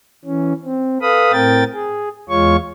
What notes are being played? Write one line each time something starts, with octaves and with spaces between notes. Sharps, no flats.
E3 C#4
C4
A4 B4 F5 B5 D#6
A2 C4 A#4 G5 A6
G#4
E2 G#3 F4 C#5 C#6